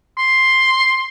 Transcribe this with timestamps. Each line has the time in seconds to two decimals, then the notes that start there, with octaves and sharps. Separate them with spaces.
0.18 C6